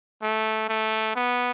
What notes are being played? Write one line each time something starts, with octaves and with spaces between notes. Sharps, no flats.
A3
A3
B3